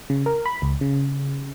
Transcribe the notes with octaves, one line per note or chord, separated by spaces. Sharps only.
C#3
A#4
B5
C#2
C#3